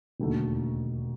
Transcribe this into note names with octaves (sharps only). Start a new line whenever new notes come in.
E1 D#2 D3 F#3 A3